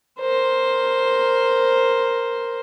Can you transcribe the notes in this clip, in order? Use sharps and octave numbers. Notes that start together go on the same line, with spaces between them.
A#4 C5